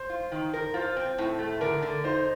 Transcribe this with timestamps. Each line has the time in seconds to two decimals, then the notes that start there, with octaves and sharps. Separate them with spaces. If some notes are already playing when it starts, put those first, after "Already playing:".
Already playing: C5
0.09 F4
0.32 D#3
0.54 A#4
0.74 F4 C5
0.97 C4
1.18 A2
1.39 A3
1.61 D3 A#4
1.82 D3
2.04 D#4 C5